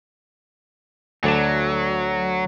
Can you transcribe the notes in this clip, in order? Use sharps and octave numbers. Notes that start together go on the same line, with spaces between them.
D2 F#3 D5 A5